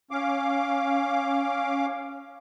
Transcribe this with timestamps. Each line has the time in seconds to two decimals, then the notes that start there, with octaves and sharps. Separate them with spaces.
0.11 C#4 F5 D6